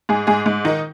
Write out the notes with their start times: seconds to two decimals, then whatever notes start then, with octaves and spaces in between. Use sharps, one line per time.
0.09 G#2 G#4
0.27 G#2 G#4
0.46 G#2
0.65 D#3 D#4